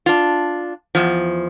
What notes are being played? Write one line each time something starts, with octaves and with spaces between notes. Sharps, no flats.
D4 F4
E2 F3